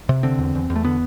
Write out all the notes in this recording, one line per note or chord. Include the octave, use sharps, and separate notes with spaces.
C3
D3 C4
E2
E2
E2
A3
D3 B3